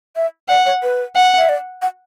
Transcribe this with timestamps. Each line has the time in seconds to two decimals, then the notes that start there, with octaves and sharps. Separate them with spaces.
0.16 E5
0.49 D5 F#5
0.66 C#5
0.83 B4
1.16 F#5
1.38 E5
1.49 D5
1.82 F#5